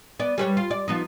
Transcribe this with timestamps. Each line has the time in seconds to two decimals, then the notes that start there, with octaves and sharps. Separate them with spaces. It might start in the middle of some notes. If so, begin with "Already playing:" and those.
0.19 B3 D5
0.38 G3 B4 C#5
0.57 F4
0.71 D5
0.88 F3 B3 D#4